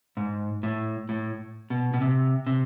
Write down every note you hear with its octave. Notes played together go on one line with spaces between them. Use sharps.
G#2
A2
A2
B2
B2
C3
C3